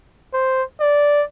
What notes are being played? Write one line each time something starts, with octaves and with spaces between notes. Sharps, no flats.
C5
D5